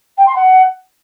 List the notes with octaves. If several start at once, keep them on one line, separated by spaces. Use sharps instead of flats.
G5
C6
F#5